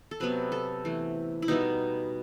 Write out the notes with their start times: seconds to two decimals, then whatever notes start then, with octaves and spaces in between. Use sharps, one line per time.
0.11 A4
0.20 C3 F#3 B3 B4
0.52 A4
0.85 E3 A3
1.42 E4
1.48 B2 G3 B3 D#4